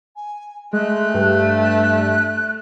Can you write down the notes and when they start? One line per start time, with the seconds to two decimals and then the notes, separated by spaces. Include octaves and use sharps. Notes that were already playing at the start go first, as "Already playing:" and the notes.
0.16 G#5
0.73 G#3 A3 F#6
1.14 G2
1.63 F#6